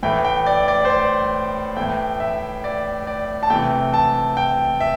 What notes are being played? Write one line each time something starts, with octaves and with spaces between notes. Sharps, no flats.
A2 E3 A3 G5
G5
D5
D5
C5
D5
A2 E3 A3 G5
E5
D5
D5
A5
C3 E3 A3 G5
A5
G5
E5